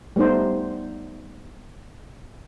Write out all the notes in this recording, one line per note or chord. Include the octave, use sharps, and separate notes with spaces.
G3 A3 B3 D#4 C5